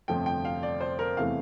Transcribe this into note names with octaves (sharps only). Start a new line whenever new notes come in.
G1 F2 C3 F3 A3 G5
G5
F5
D5
C5
A#4
E2 C3 E3 A3 F5